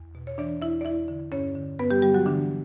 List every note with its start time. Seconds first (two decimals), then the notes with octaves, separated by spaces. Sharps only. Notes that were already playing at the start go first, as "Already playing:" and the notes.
Already playing: E2
0.15 B2
0.27 C#5
0.38 E3 D4 D5
0.62 E2 E4 E5
0.81 D5
0.85 E2 E4 E5
1.08 D3
1.32 G2 C#4 C#5
1.55 D3
1.79 G2 B3 B4
1.91 G3 G4
2.02 D3 G3 G4
2.14 F#3 F#4
2.26 D3 E3 D4